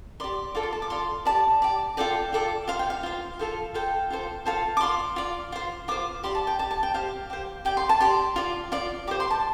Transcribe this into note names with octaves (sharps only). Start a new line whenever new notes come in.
G4 D5 C6
F4 A4 D5 D6
C6
A5
D6
F4 A4 D5 C6
G4 D5 A5
G4 D5
F4 A4 D5 G5
F4 A4 D5
F4 C5 F5
G5
F5
F4 C5
F4 A4 C5 F5
F4 A4 C5 G5
F4 A4 C5
F4 A4 C5 A5
D6
F4 D5 C6
F4 D5
F4 C5
F4 C5 D6
G4 D5 C6
A5
G5
G4 D5 A5
A5
G5
G4 C5 F5
G4 C5
G4 D5 G5
C6
A5
G4 D5 C6
F4 D5
F4 D5
G4 C5 D6
C6
A5